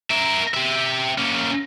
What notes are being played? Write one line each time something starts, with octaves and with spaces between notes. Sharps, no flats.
A#4 E5
G4 E5
A#3 C#4